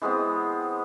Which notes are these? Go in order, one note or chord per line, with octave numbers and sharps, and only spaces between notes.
E3 G#3 B3 C4